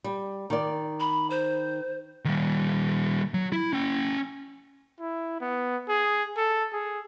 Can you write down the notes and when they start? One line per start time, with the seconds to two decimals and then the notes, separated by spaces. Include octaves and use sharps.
0.04 G3
0.50 D#3 D5
1.00 B5
1.30 C5
2.25 D#3 G3
3.34 F#3
3.52 E4
3.73 C#4 G5
5.00 E4
5.41 B3
5.89 G#4
6.37 A4
6.73 G#4